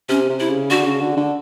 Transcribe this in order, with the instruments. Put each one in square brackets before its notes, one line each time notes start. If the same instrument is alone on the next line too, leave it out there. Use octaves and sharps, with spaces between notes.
[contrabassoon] C3 [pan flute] C#4
[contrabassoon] C3
[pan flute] E4
[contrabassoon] C#3
[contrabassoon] D3 [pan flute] F#4
[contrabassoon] C#3
D3
D3